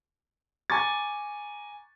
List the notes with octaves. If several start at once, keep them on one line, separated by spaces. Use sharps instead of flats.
G#5 A#5 C#6 D6 A6